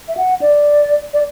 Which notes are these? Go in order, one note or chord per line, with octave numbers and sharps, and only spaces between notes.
E5
F#5
D5
D5